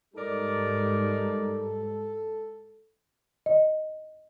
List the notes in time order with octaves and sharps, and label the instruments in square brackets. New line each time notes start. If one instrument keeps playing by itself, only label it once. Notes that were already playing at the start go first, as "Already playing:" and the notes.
[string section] G#2 G3 [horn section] D#4 A#4 D5 [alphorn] A4
[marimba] D#5